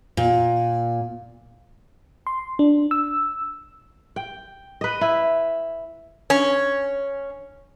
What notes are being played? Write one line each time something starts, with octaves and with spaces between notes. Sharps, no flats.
A#2
C6
D4
E6
G5
B4 D#5
E4
C#4